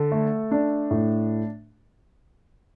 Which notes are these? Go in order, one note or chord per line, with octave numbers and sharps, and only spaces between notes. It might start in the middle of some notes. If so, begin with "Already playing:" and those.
Already playing: D3 A4
A3
D4
A2